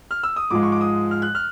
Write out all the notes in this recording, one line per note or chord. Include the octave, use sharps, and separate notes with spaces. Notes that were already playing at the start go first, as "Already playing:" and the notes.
F6
E6
D#6
G#2 F3 G#3 D6
C#6
D6
D#6
F6
F#6
F6